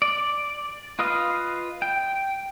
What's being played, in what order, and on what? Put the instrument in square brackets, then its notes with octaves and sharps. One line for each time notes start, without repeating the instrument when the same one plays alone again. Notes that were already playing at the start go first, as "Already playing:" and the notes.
[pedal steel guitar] D5
F4 B4 D#5 F5
G5